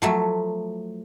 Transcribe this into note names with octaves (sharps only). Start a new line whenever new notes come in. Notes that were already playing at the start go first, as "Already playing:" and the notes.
F3 F#3 A3